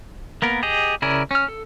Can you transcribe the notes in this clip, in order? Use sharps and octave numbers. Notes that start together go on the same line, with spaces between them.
A#3 B3 A#4
G4 G#4 D#5
C#3 E4 A#4 D5 G#5
C#4 F6
A4